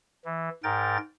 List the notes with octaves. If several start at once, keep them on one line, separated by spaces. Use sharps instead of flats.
E3
G#2 A#4 G5 A6